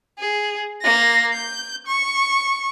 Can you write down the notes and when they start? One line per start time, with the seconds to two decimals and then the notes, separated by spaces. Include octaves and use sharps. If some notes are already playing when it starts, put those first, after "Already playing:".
0.19 G#4
0.82 A#3 A#6
1.33 G6
1.87 C#6